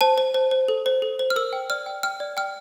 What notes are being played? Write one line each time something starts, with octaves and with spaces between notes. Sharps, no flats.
C5 A5
C5
C5
C5
A4
C5
A4
C5
F6
A#4 E6
G5
D5 F6
G5
G5 F6
D5
G5 F6